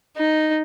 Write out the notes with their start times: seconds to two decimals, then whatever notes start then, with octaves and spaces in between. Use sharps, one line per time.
0.17 D#4